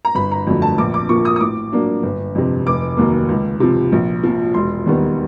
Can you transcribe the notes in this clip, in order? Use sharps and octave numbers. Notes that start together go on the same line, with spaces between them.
A#5
G1 B5
A#5
F2 D3 F#3 A3
A5
A#1 D6
D6
A#2 F3 A#3 C#6
D#6
D#6
A2 D6
F#3 A#3 D4
G1
F2 C3
F1 D6
D#2 D#3 F#3 A#3
C#2
C3 F3
A#1
A#2 F3
E1 C6
D#2 D#3 G3 B3